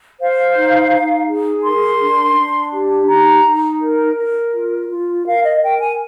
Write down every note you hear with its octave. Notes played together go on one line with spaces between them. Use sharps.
C5 F5
D#4
D#4
G#4
A#4 C6
D4
D4
G4
D#4 A#5
D#4
A#4
A#4
F4
F4
A#4 F5
D#5
A#4 G5
G#5